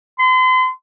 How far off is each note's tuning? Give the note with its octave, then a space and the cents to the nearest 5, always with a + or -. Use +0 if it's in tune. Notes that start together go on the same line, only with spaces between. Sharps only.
C6 -40